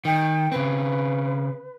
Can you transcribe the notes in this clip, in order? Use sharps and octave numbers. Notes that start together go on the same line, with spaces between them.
D#3 G5
C#3 C4 B4